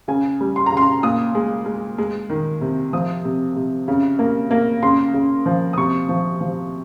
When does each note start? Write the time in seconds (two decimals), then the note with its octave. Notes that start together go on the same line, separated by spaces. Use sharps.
0.08 C#3 G#5
0.41 G3
0.56 C6
0.66 A#5
0.72 C#3
0.77 C6
1.03 A#2 D#6
1.35 G#3
1.66 G#3
1.98 G#3
2.30 D#3
2.61 C3
2.93 F3 D#6
3.25 C3
3.56 C3
3.88 C#3
4.19 A#3
4.51 A#3
4.82 C#3 C6
5.14 C#3
5.46 F3
5.73 D#6
5.77 C3 C#6
6.09 F3
6.41 F3